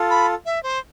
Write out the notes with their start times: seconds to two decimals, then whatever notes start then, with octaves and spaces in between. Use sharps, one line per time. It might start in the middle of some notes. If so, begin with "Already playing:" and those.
Already playing: F4 A4
0.10 B5
0.46 E5
0.63 C5